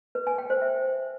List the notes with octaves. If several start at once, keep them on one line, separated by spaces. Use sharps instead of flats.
B4
G#5
G5
C5
E5